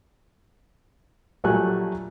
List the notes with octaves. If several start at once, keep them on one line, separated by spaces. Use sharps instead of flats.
A#1 F#3 G3 A3 G#5 F#6